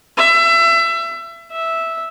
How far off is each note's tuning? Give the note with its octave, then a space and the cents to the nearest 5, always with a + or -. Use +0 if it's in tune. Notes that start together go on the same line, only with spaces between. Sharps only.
E5 +25
E5 -5